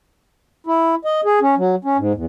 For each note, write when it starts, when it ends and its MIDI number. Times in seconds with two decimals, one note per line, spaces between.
0.67 0.95 64
1.05 1.21 75
1.25 1.39 68
1.41 1.55 61
1.58 1.75 54
1.85 1.97 61
1.98 2.13 44
2.15 2.25 40